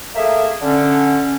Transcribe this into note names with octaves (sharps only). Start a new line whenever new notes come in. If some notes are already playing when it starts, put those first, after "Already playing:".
A3 A#3 G#4 E5
D3 C#4